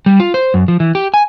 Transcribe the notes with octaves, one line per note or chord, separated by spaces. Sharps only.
G3
F4
C5
F#2
F3
E3
G4
G#5